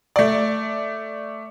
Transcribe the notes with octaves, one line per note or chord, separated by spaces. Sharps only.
A3 D5